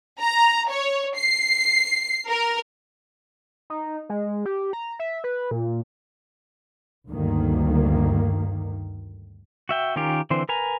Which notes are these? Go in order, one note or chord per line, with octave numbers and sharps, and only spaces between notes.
A#5
C#5
C7
A#4
D#4
G#3
G4
A#5
E5
B4
A#2
D2 G2 D#3 A#3
F#4 E5 G5
D#3 C#4 F4 G4 A#4
D3 E3 C4 C5
A#4 B4 G#5 A#5